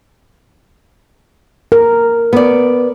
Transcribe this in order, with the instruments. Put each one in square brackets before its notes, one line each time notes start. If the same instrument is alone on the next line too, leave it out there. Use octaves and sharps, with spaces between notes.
[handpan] A#4
[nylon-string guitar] B3 D5